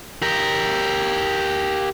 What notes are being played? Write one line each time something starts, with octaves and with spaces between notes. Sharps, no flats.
G4 A#4